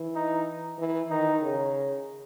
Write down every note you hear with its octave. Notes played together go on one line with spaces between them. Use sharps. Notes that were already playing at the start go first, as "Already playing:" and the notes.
Already playing: E3
D#4
E3
D#3 D#4
C#3